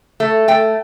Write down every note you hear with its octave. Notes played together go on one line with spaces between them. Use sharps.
A3
A3 G5